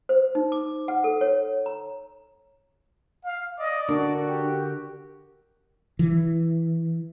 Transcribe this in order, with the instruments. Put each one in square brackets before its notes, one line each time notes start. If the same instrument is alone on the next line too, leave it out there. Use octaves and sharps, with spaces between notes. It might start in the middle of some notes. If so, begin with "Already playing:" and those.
[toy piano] C5
D#4
D6
F#5
A4
C#5
A#5
[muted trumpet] F5
[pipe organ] D5 [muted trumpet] D#5
[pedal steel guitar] D3 A#4 D6 [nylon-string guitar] D4 [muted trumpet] F#4
[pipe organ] G4
[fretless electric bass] E3